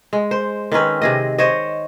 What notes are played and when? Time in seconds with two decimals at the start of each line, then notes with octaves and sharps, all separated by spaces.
0.13 G#3
0.31 C5
0.72 D#3 C4 C#4 B4
1.02 C3 G#4 D#5
1.38 C5 C#5 D#5